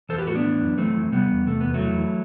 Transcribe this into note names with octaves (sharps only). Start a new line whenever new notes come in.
E3 A4 C5
G4 B4
A2 F#4 A4
B3 D4
E3
F#2
E3 A3 C4
E3
C3 G3 B3
E2
C3 A3
E2 B3
F#3 A3
E3
E3